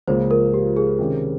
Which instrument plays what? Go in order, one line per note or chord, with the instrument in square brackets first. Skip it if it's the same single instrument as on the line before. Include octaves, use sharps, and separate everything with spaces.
[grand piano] C#2 C#3 F3 A#3 [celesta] C5
[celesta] A#4
G4
G#4
[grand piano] C3 D#3 G#3 C#4 G4